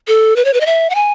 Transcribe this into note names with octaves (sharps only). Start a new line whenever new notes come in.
A4
B4
C#5
B4
D#5
E5
F#5
G#5